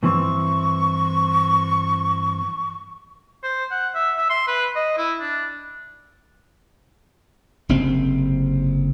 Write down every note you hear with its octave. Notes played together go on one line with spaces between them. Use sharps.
G2 E3 C4 C#6
C5
F#5
E5
E5
C6
B4
D#5
E4
D4
F#1 C3 C4